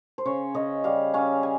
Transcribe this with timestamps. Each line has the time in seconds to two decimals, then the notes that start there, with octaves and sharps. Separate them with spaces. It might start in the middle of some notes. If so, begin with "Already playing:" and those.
0.18 C5
0.25 C#3 C#5
0.55 C#3 D#5
0.84 G3 F5
1.14 C#4 F5
1.43 G#5